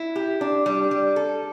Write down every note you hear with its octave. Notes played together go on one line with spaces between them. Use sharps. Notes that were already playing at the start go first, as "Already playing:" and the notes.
Already playing: E4
G4
D4
G3
G3
A4